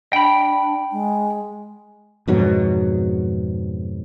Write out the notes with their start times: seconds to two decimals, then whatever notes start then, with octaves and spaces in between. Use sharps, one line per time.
0.13 D4 G5 B5
0.92 G#3
2.28 F2 G#2 B2 F#3